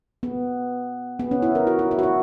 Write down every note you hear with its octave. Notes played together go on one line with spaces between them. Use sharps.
B3
B3
C#4
E4
A#4
F#4
E4
E4
F#4
E4